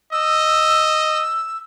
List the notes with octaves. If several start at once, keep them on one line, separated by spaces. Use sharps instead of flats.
D#5 E6